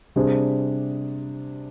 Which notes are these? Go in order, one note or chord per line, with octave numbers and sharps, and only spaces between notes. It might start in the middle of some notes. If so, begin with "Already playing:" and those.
C3 G3 D4 G#4 C5